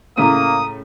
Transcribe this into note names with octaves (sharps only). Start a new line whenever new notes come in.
A2 C#3 A3 A#3 A#5 D#6 D#7